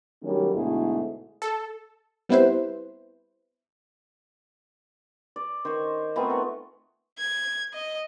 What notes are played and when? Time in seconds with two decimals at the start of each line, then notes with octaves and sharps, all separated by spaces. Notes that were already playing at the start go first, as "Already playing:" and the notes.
0.22 D#3 F#3 G3 A3 C#4
0.54 D2 G#2 B2 A3 E4 G#4
1.42 A4
2.29 G3 B3 C4 E4 B4 C5
5.36 D5
5.65 D#3 C5 C#6
6.16 A3 B3 C4 D#4 F4 G#5
6.30 F#5 A#5
7.18 G#6
7.74 D#5